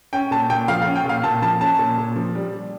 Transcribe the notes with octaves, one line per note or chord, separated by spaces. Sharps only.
C#4 G5
A#2 A5
A#2 G5
F3 F5
F5
C#4
G5
A#2 F5
A#2 A5
F3 A5
C#4 A5
A#2
A#2
F3
G3